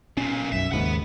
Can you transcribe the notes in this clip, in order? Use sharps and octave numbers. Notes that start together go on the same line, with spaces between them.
B1 A#2 C#4
B1 F#2 E5
D#2 G#2 C#3 F#5 B5